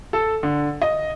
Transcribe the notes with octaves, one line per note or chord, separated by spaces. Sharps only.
A4
D3
D#5